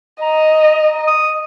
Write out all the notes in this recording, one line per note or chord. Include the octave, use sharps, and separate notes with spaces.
D#5 A#5
D#6